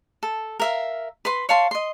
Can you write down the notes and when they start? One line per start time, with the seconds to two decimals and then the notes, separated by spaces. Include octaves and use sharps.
0.23 A4
0.60 A#4 E5 F5
1.25 B4 B5 C6
1.49 C#5 F5 A5 C6
1.71 D#5 C6